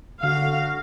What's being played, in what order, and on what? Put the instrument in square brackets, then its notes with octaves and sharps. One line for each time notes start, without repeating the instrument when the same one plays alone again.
[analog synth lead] D3 [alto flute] F#4 [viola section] F5